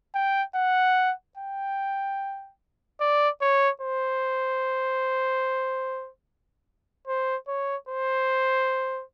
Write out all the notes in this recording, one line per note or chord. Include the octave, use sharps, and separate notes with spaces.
G5
F#5
G5
D5
C#5
C5
C5
C#5
C5